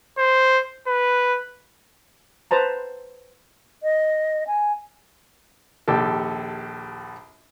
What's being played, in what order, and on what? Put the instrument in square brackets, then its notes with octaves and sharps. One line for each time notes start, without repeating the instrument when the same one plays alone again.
[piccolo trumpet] C5
B4
[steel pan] B4 C5 A5 A#5
[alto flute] D#5
G#5
[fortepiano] A#1 D#2 G4 A4